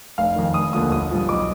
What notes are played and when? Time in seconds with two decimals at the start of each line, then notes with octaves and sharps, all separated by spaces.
0.18 F1 F5
0.36 F2 D#3
0.54 F1 D#6
0.73 D#2 D3 F3 D#6
0.91 G1 D#6
1.11 G2 F3
1.29 B1 D6